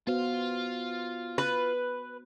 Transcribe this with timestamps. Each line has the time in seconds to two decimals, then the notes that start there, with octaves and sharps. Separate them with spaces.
0.07 B3 F4 F#4 C5 F5
1.38 B4